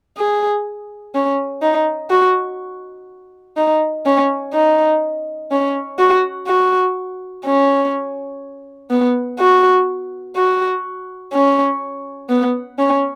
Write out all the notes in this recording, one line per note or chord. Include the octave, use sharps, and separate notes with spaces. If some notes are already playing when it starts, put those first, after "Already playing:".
G#4
C#4
D#4
F#4
D#4
C#4
D#4
C#4
F#4
F#4
C#4
B3
F#4
F#4
C#4
B3
C#4